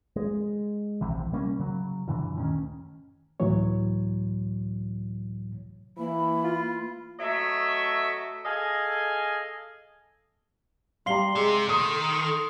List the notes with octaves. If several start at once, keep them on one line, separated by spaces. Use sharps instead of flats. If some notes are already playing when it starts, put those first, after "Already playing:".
G#3
D#1 A#1 C3 E3
G3 A#3 C#4
C#3 F#3
F#2 A#2 D3 E3
D2 D#3 C#4
C#2 A2 E3 F#3 C#5
E3 A#3 B5
F4
F#3 A3 D#5 E5
G#4 A4 D#5 F5 G#5
G3 F5 A#5 C6 C7 G7
C3 G#3
D#3 A4 D#6
A4